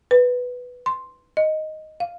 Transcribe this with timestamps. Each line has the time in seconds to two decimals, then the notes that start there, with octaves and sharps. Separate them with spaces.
0.11 B4
0.86 C6
1.37 D#5
2.00 F5